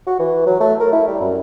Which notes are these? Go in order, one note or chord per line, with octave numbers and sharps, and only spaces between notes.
F#4
E3
F#3
A3
A#4
E4
G3
F#2